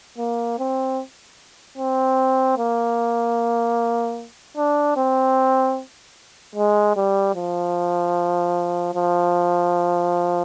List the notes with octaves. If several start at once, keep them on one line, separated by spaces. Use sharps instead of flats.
A#3
C4
C4
A#3
D4
C4
G#3
G3
F3
F3